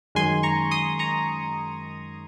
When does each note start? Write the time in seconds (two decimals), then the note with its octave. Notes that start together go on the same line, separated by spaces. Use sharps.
0.15 F#2 D#3 G#3 G#5 C6
0.43 A#5 C#6
0.71 C6 D#6
0.99 A#5 C#6